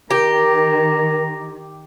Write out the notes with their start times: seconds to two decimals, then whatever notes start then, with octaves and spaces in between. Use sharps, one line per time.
0.11 D#3 G4 A#4 A#5